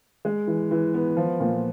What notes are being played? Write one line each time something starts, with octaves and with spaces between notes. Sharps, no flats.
G#3
E3
E3
B3
F3
A#2